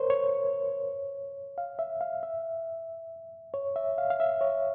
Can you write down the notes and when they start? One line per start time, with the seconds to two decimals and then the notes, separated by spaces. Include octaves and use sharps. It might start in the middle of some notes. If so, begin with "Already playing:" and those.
Already playing: A#4 C5 C#5
0.10 C#5
1.58 F5
1.79 E5
2.01 F5
2.23 E5
3.54 C#5
3.76 E5
3.98 F5
4.10 F5
4.20 E5
4.41 C#5